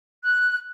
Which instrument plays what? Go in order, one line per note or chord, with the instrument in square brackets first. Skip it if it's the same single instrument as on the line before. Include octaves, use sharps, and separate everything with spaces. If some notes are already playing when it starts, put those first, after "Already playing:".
[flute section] F#6